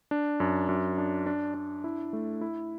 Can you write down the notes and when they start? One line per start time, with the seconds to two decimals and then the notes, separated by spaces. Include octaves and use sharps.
0.11 D4
0.40 F#2
0.69 F#2
0.98 D4
1.26 D4
1.54 D4
1.84 E4
2.13 A3
2.41 E4